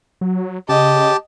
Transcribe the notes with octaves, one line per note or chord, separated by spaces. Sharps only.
F#3
C#3 G4 D#5 A5